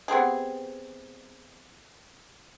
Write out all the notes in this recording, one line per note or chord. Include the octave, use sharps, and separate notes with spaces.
B3 C4 G4 G#4